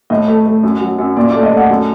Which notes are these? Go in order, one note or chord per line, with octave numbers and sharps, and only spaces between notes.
A2 D#5
A3
A3
F#2
F#3
F#2
A#2 D5
D5
A3
D#5
A3
F#5
F#2